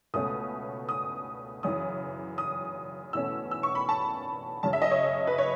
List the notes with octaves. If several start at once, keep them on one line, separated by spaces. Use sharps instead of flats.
C#2 B2 A3 C#4 D#6
D#6
F#2 C#3 E3 D#6
D#6
E2 B2 A3 C#4 E6
E6
C#6
B5
A5
F#2 C#3 F#3 A5
E5
D#5
C#5
B4
C#5